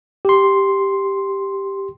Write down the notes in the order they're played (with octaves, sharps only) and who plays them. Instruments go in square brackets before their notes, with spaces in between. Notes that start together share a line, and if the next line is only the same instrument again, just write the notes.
[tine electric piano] G4 C6